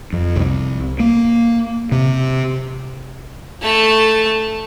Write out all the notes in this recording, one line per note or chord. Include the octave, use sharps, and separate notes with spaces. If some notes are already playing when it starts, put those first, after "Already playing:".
F2
C2
A#3
C3
A3 A5